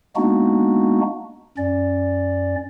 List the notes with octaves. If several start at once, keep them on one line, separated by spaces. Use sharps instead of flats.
G#3 A#3 B3 D4 D#4 F#4
F#2 C#4 D5